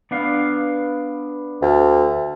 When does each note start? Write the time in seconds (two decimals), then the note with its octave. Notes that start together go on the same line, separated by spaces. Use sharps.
0.11 B3 D4 F5
1.62 D2